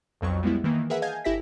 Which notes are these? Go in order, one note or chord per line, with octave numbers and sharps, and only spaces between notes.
B1 F2 F#3 C#6
G3 G#3 B3 E4
D#3 E3 A#3
G#4 A#4 B4 E5 F#5
D#5 F5 G#5 A5 G6 G#6
G1 E4 G4 E5 A#6 B6